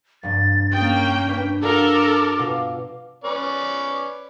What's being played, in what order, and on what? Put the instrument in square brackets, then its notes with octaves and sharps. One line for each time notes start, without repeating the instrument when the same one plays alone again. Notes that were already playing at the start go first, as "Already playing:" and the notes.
[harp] F1 G2 [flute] A6
[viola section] A#3 G5 [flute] C#4 [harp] D#6 A6
[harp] D4 B4
[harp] D4 F4 F#4 [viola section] A4 A#4 [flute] D6
[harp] B2 F4
[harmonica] C#4 B4 D5